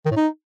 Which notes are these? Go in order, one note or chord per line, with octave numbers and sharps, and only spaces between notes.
D#3
A2
D#4